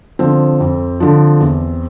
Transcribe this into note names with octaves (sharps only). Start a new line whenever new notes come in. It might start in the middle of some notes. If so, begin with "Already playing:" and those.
D3 F3 C4
F2
D3 F3
E2